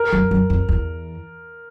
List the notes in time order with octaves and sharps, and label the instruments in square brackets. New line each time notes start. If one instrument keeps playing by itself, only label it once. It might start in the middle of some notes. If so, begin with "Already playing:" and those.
Already playing: [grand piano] A#4
[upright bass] F#2
F#2
F2
E2